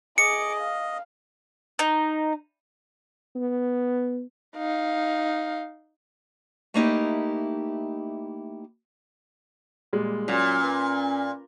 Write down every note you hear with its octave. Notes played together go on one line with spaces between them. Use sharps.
G#4 D#5 D6 C#7
F5
D#4
B3
D#4 F5
A3 A#3 D#4 E4 G4
A#2 G3 G#3
A#2 F#3 C#4
B4